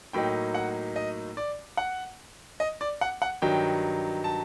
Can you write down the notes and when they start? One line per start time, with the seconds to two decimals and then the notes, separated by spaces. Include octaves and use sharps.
0.13 A2 F#3 A#3 D#4 G5
0.55 F#5
0.96 D#5
1.37 D5
1.77 F#5
2.60 D#5
2.81 D5
3.01 F#5
3.22 F#5
3.42 G2 D#3 F#3 G5
4.24 A5